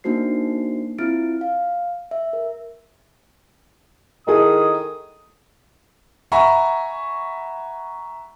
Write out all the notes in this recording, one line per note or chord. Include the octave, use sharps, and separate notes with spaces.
A#3 D4 D#4 F#4 C5 C7
C4 E4 F4 F6 A6 D7
F5
E5
A#4
D#3 E4 G#4 A4 D#6
E5 F#5 G#5 A#5 B5 C#6